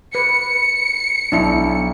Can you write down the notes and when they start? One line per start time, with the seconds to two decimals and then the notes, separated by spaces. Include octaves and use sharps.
0.15 B4 C#7
1.32 B1 D4 E4